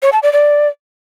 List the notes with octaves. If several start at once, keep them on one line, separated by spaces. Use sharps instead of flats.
C#5
A5
D5
D5